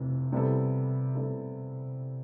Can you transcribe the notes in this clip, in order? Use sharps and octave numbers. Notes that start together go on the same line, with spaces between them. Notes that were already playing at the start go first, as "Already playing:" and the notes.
Already playing: F1 F2 C3 E3
C3 G3 B3 E4 A4
C3 G3 B3 E4 A4